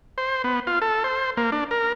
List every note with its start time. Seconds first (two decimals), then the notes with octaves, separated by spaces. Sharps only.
0.18 C5
0.44 B3
0.67 F4
0.82 A4
1.04 C5
1.37 A#3
1.52 D4
1.71 A#4